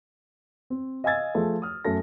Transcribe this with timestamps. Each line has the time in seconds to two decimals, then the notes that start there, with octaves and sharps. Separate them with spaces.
0.70 C4
1.04 D#5 F5 G#5 E6 G#6 A6
1.35 F3 A3 G#4
1.62 D#6 F6
1.85 F#2 A3 A4 A#6